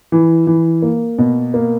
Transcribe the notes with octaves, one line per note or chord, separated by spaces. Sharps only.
E3
E3
A#3
B2
A#3